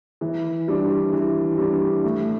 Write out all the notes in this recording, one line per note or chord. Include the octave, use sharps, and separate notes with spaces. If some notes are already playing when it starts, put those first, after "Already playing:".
E3
G3 D4
E3
G3 D4
A2